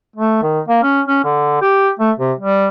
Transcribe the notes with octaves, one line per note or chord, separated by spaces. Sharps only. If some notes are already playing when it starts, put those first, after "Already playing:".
A3
D#3
A#3
C#4
C#4
D3
G4
A3
C3
G3